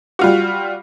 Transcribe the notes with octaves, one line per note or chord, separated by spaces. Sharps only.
G3 F4 F#4